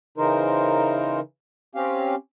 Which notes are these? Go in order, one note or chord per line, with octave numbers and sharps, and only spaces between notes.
C#3 E3 D#4 A#4 C5
C4 C#4 G4 F5